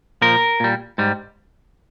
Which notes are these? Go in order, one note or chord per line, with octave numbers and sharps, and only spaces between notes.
A#2 F3 A#4
A#2 G3
G#2 G3